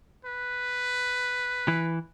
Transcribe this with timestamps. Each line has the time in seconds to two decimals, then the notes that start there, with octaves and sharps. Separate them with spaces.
0.25 B4
1.68 E3